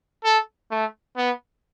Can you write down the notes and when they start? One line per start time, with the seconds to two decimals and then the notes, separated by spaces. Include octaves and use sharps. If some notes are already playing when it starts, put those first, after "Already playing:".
0.24 A4
0.71 A3
1.17 B3